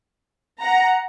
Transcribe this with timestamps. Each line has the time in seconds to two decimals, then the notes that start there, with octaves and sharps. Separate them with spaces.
0.61 F#5 A#5